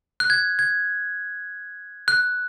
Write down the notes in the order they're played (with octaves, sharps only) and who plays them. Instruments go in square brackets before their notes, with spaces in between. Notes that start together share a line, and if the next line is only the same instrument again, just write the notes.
[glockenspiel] F#6
G#6
G#6
F#6